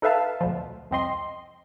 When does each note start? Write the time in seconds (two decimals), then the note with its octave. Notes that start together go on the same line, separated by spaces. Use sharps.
0.02 D#4 A4 B4 E5 F5 A5
0.41 D2 B2 F3
0.91 C2 F2 C4 D#5 C6